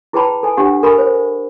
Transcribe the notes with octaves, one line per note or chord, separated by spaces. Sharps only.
E4 G#4 B4 G5 A5 B5
A4 G#5
D4 G4 F#5
A4 A#4 G#5 B5 C#6
C5